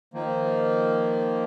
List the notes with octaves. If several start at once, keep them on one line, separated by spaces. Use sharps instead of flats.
D#3 F3 A#3